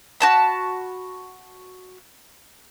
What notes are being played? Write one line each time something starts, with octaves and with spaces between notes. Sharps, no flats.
F#4 A5 B5